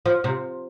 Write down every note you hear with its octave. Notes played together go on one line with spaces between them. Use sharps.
F3
C3